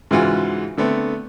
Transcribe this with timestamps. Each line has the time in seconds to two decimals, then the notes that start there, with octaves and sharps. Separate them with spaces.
0.11 G#2 C#3 E3 F4 F#4 F#5
0.78 D3 A3 B3 C4